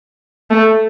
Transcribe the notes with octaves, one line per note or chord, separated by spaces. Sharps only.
A3